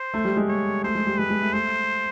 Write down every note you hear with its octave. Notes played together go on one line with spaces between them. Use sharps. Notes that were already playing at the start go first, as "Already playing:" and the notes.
Already playing: C5
A3
G3
G#3
C#5
A3 C5
G#3
G3
G#3 B4
G#3
A3
A3 C5